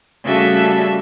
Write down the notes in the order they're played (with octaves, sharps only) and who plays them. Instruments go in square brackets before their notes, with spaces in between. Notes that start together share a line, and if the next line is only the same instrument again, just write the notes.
[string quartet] C#3 G3 A3 F#4 E5 A5